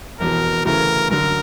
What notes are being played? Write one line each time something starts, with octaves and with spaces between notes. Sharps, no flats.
F1 E2 B2 A#4
D2 C#3 E3 A3 A#4
F#2 D3 F#3 A#4